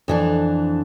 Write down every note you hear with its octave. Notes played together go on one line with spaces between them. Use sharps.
F2 E3 D4